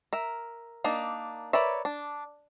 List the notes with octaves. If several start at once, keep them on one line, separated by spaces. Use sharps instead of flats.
A#4 E5
A#3 D4 D#4
A#4 B4 C#5 D5 E5
D4